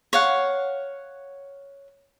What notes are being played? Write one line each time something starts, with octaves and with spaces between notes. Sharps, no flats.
C#5 F5 F#5